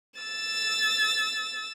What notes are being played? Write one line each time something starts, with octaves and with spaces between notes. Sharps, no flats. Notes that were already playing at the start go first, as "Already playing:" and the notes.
E6 A6